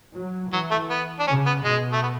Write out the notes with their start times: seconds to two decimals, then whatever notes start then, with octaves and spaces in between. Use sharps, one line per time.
0.15 F#3
0.52 E3 F#3
0.71 A3
0.90 B3
1.19 D4
1.27 C#3 C#4
1.46 B3
1.65 B2 G#3
1.93 A3
2.02 B3